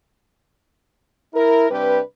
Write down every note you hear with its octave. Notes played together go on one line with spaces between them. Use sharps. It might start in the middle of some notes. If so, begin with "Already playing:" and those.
E4 A#4
C3 G3 C4 D4 G4 B4